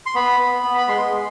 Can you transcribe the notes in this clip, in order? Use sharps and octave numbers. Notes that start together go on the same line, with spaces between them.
C6
B3 B5
B3
B3
B5
G#3 C6
G#3